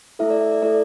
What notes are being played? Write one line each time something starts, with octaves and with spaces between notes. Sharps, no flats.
A3 E4 A4 E5
D5
E5
D5
A3 E4 A4 D5